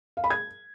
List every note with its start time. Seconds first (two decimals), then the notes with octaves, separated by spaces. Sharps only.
0.17 F5
0.24 B5
0.30 G#6